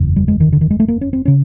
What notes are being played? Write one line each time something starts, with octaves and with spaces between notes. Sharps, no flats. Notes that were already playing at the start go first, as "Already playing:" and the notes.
Already playing: F#1 E2 C#3
G3
G#3
D#3
D3
D#3
G#3
A3
A#3
C#4
C4
C#3 C#4